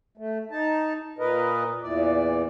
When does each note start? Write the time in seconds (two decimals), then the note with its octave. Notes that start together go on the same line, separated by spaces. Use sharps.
0.17 A3
0.51 D#4 A5
1.19 A#2 A#4 B4 D#5
1.81 E2 A#2 E3 D5